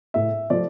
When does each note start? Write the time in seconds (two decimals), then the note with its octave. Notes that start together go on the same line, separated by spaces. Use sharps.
0.14 A2 E5
0.50 F3 A3 D5